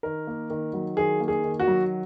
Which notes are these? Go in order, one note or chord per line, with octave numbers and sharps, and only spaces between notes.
D#3 A#4
A#3
D#3
F#3
D#3 G#4
A#3
G#4
D#3
F#4
F#3